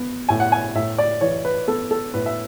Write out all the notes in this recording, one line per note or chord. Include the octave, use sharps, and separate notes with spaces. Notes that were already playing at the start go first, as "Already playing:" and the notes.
Already playing: B3
A2 G#5
F#5
G#5
A2 E5
D5
E3 C#5
B4
B3 A4
A4
A2 B4
E5